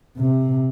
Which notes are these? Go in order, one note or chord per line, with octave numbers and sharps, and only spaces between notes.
C3